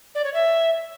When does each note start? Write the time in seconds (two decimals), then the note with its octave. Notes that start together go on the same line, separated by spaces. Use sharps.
0.15 D5
0.24 C#5
0.34 E5